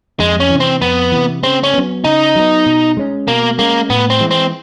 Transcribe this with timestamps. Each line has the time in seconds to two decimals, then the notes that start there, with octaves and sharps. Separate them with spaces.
0.20 F2 G#3
0.40 C#4
0.50 C3 E3
0.60 C4
0.81 F2 B3
1.12 C3 E3
1.43 C#3 C4
1.63 C#4
1.74 F#3 B3
2.04 C#3 D#4
2.35 F#3 B3
2.66 B2
2.97 G#3 C#4
3.28 B2 A#3
3.59 G#3 A#3 C#4
3.90 A2 B3
4.10 C4
4.20 E3 G#3
4.31 C4